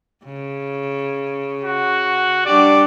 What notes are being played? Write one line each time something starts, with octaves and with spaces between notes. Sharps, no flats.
C#3
F#4
G3 D4 G4 D5